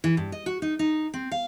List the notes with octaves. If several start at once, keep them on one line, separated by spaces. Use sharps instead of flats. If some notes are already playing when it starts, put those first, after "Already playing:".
E3
G2
D#5
F#4
D#4
D#4
C4
F5